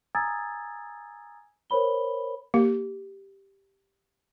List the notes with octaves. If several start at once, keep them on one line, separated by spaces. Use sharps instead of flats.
G#5 A#5 D#6 E6 G#6 A6
A#4 C5 C#5 B5 G7
A#3 G4